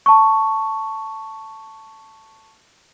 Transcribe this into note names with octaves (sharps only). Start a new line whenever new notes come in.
A5 C#6